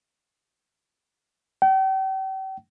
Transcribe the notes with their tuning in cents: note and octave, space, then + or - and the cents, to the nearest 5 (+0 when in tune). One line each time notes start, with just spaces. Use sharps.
G5 -40